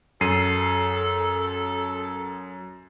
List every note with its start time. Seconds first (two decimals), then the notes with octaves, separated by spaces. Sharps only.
0.21 F#2 A4 C7 D#7